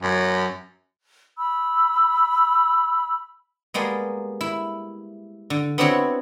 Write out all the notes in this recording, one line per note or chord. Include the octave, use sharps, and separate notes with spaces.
F#2
B5 E6
G3 G#3 A#3 B3
E4
D3
B3 C4 D4 E4 F#4 C#5